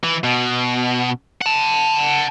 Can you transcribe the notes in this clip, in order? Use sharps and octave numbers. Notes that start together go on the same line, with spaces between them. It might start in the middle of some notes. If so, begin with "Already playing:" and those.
E3
B2
F#5 A5